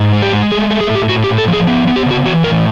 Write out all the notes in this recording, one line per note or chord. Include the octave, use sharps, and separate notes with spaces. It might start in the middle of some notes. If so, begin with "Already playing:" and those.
Already playing: G#2
G#3
G4
G#3
A3 G#4
A3
G#4
A2
G4
A2 F#4
G4
A2
A4
F3
G#4
B3
B3
G4
C#3 F#4
E3 F#4
A2 A#4